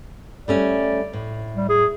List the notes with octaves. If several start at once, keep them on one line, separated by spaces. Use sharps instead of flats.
G3 A3 C#4 D5
A2
G3
G#4